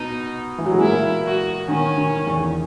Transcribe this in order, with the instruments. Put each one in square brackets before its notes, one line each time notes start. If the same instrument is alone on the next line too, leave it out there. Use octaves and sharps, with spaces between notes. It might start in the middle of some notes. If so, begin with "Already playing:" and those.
Already playing: [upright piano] B2 [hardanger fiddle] D#4
[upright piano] E3
F#3
G#3
[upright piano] A#2 A#3 [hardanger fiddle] E4
[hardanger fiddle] F#4
[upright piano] D#3 [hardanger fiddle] C#4
[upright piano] D#3
E2 E3